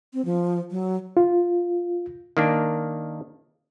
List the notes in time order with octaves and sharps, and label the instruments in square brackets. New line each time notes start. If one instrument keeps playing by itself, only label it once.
[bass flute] C4
F3
F#3
[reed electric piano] F4
[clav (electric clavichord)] D#3 A#3 D4